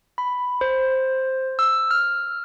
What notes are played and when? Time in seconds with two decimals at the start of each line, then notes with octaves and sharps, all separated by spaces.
0.18 B5
0.61 C5
1.59 E6
1.91 F6